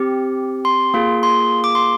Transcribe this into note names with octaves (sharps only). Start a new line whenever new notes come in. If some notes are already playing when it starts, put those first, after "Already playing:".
Already playing: C4 G4
C6
A#3 F4 G#4
C6
D6
C6